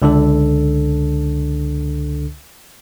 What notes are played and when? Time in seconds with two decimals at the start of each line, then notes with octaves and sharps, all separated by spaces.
0.02 C#2 D3 D4 A4